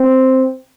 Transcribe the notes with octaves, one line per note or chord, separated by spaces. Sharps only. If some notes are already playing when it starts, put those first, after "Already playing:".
Already playing: C4